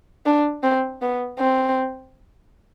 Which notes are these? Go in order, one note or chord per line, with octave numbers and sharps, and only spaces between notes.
D4
C4
B3
C4